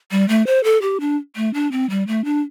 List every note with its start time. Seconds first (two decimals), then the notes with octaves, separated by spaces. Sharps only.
0.11 G3
0.29 A3
0.47 C5
0.64 A4
0.82 G4
1.00 D4
1.36 A3
1.54 D4
1.72 C4
1.90 G3
2.07 A3
2.25 D4